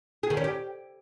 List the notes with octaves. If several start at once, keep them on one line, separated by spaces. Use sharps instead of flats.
G#4
D#3
C#4
G4